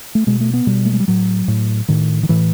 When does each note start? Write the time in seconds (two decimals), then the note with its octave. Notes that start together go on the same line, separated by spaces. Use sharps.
0.15 A3
0.27 B2 G#3
0.40 A3
0.53 B3
0.67 B2 G3
0.85 A3
0.93 G#3
1.00 G3
1.08 A2 F#3
1.48 A2
1.88 A2 D#3
2.23 D#3
2.29 A2 E3